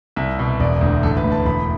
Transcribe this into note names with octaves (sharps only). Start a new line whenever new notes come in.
C2 E5
B2
E1 D5
D2
A1 A4
B4
A2
A5
E1 B5